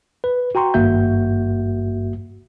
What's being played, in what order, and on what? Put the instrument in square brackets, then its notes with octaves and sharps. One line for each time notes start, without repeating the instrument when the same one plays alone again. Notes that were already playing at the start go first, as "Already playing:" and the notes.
[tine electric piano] B4
F#4 G5 A#5 C6 C#6
G#1 G2 A#3 F#4 E5 G6